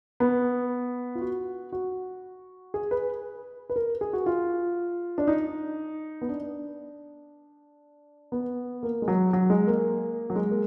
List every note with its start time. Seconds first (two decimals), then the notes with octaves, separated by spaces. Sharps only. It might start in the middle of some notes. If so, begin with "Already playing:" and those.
0.20 B3
1.15 F4
1.21 F#4
1.72 F#4
2.74 G#4
2.91 B4
3.70 B4
3.76 A#4
4.01 G#4
4.13 F#4
4.26 F4
5.18 D4
5.27 D#4
6.21 B3
6.29 D4
8.32 B3
8.83 A#3
9.02 G#3
9.08 F#3
9.33 F#3
9.50 G#3
9.67 A#3
10.30 F#3
10.36 G#3
10.51 A#3